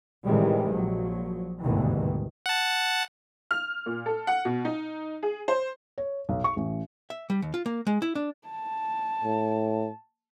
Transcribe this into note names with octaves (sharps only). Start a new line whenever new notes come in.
A2 C3 D#3 E3 G3 G#3
A#1 F3 F#3
G#1 D2 G2 B2 D#3 E3
F#5 A5
F6
A#2
A4
F#5
B2
D#4
G#4
C5
C#5
B1
C#6
A1
E5
G3
D#2
F4
A#3
G#3
E4
D4
A5
A2